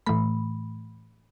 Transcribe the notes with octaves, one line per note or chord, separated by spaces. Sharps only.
A2 E3 A3 B5